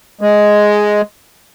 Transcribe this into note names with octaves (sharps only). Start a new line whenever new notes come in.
G#3